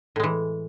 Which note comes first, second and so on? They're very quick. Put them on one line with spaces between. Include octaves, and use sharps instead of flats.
A2 G#3 E3